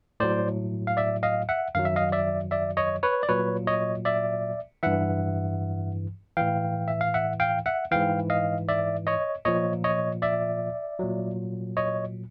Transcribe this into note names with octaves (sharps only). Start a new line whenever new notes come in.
A2 F#3 C5 D5
F5
D5 E5
D#5 F5
E5 F#5
F#2 D#3 F#3 F5
E5
D#5 F5
D5 E5
D5 E5
C#5 D#5
B4 C#5
D5
A#2 F#3 B4 C#5
C#5 D#5
D5 E5
G2 E3 E5 F#5
A2 E3 F5 G5
E5
F5
E5 F#5
F5 G5
E5 F#5
G#2 E3 F5 G5
D#5 F5
D5 E5
C#5 D#5
A#2 F3 C#5 D#5
C#5 D#5
D5 E5
A#2 F#3
C#5 D#5